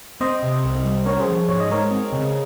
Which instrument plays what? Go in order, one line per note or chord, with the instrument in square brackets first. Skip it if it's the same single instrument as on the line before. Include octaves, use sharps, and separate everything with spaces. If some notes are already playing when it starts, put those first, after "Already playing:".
[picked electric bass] C4 [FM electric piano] C5 D#5
[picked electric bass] C3
C2
G3
[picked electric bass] C#4 [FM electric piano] A#4 C#5
[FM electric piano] G#4 C5
[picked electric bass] F3
[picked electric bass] G#2 [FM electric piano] C#5
[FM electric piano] D#5
[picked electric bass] G#3 [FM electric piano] A#4 C#5
[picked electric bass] C4
C#3